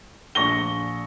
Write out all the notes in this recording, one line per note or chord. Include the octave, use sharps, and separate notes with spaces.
A#1 C#6 A#6 G7